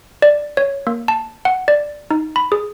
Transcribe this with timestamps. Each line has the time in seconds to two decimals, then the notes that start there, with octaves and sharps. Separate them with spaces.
0.22 D5
0.57 C#5
0.87 A#3
1.08 A5
1.45 F#5
1.68 D5
2.11 D#4
2.36 B5
2.52 G#4